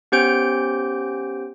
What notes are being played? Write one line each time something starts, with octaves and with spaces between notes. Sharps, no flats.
B3 C#4 G4 C5 G6 D7